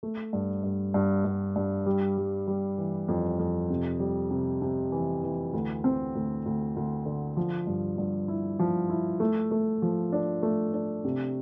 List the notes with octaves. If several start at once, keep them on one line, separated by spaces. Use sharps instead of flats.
A3
G2
G2
G2
G2
G2
G3
G3
G3
E3
F2
F2
C3
G3
C3
C3
E3
E3
D2
C4
D2
D2
D2
D3
F3
G2
G2
E4
F3
E4
A3
A3
F3
D4
A3
D4
C3